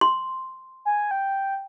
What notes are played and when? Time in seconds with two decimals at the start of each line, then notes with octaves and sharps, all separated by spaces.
0.01 C6
0.85 G#5
1.11 G5